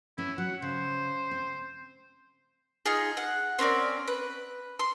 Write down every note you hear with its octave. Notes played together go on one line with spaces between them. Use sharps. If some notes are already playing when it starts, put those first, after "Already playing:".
B3 C#4 E4
F#3 F#5
C#3 C5
C4
D#4 F4 G#4
F#5
C4 C#4 A#4 D5
B4
C6